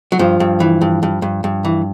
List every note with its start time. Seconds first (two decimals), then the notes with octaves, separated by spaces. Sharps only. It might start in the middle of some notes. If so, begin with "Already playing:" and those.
0.12 F#3
0.19 G2 F3
0.40 G2
0.60 E3
0.81 G2
1.03 G2
1.22 G2
1.44 G2
1.65 E3